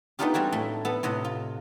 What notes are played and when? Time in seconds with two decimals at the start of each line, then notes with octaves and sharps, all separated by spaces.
0.19 A3 B3 D4 D#4 F4 G4
0.34 G3 C4 F#4 G#4
0.52 A2 A3
0.85 B3 A4 A5
1.03 A2 C3 D#5 F#5
1.25 F4